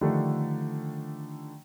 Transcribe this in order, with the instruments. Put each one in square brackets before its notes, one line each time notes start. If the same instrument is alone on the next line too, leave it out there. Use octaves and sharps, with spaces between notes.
[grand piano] D3 D#3 F3 G3 A3 D4